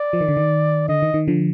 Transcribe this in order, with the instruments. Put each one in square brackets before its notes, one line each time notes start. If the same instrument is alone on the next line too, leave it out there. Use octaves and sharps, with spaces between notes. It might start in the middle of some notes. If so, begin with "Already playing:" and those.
Already playing: [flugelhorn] D5
[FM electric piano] F3
D#3
D3
D#3
[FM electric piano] D3 [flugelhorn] D#5
[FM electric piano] D#3
D#3
D3 F3